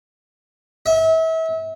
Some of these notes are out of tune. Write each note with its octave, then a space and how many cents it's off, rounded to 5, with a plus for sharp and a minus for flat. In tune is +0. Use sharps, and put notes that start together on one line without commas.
E5 -35